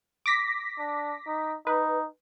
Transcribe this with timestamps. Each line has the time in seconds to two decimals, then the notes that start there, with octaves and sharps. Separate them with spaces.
0.26 D6 A#6 B6
0.78 D4
1.27 D#4
1.67 D#4 B4